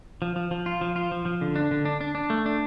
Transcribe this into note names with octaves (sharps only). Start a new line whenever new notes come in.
F3
F3
F3
F4
F3
F4
F3
F3
D3
D4
D3
D4
D4
D4
A3
D4